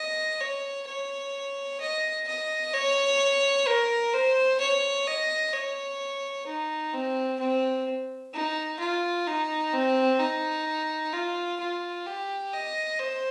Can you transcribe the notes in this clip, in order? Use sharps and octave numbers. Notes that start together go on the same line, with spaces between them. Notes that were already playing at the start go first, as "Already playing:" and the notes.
Already playing: D#5
C#5
C#5
D#5
D#5
C#5
A#4
C5
C#5
D#5
C#5
D#4
C4
C4
D#4
F4
D#4
C4
D#4
F4
F4
G4
D#5
C5